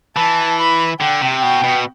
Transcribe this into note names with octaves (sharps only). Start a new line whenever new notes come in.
E3 A5
B5
D3 G5
C3
B2 G5
B2